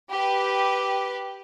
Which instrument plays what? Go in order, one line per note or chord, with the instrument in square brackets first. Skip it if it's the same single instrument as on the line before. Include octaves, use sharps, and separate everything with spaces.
[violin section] G4 B4